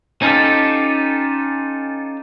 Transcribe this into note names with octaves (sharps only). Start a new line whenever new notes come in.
C#4 D#4 F4 G4 A4